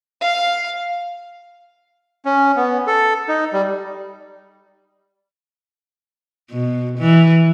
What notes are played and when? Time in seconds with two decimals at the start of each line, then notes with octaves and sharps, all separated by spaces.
0.21 F5
2.25 C#4
2.56 B3
2.87 A4
3.28 D#4
3.53 G3
6.51 B2
6.99 E3